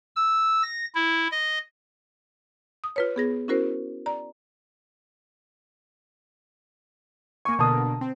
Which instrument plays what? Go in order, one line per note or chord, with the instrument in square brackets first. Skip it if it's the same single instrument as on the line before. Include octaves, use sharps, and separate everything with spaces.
[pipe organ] E6
A#6
E4
D#5
[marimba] D#6
F4 B4 C#5
B3 G#4 A#6
C#4 E4 F#4 A#4 C5
D5 A#5
[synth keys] A#3 G#5 [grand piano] C#6
[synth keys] B2 D3 A#3 [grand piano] A5 D#6
[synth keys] C4